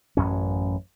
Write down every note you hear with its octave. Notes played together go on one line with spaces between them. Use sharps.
A1 F#2 C#4